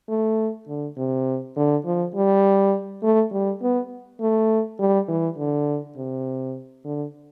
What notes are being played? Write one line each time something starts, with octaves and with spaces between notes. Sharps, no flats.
A3
D3
C3
D3
F3
G3
A3
G3
B3
A3
G3
E3
D3
C3
D3